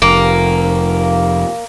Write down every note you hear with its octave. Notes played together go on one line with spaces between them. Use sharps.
F1 A#3